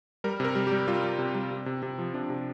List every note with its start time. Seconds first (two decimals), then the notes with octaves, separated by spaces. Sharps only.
0.24 G3 A#4
0.40 C3 A#4
0.56 G3
0.67 G4
0.72 G3
0.87 G3 F4
1.04 G3
1.19 C3
1.35 G3
1.51 C3
1.66 C3
1.83 C3
1.99 F3
2.14 C3 D4
2.30 C3